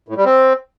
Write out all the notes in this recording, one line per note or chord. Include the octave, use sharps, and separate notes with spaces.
A2
G3
C4